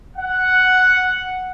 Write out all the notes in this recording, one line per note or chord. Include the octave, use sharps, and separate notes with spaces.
F#5